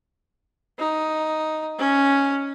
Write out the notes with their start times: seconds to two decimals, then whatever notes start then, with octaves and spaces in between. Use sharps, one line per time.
0.79 D#4
1.79 C#4